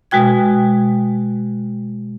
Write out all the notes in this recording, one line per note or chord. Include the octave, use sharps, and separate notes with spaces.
B2 G#3 F#4 G5 G#6